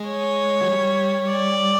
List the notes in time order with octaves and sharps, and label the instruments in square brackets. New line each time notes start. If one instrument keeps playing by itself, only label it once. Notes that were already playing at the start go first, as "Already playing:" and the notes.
Already playing: [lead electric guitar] G#3
[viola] C#5
[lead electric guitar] F#3
G3
[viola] D5